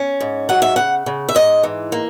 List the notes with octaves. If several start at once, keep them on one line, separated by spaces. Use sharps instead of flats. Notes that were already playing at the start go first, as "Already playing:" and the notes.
Already playing: C#4
G#2
F#3 F#5
E5
C#3 F#5
C#3
E5
G#2 D#5
E3
A#3